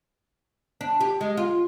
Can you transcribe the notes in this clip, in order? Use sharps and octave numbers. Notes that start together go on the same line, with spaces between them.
D4
G4
G#3
F4